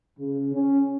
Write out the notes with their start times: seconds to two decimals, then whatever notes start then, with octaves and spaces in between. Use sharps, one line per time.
0.19 C#3
0.54 C#4